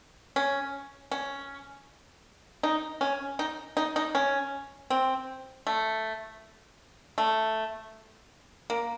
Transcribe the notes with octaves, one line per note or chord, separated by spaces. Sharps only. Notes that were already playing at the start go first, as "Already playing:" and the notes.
C#4
C#4
D#4
C#4
D#4
D#4
D#4
C#4
C4
A3
A3
A#3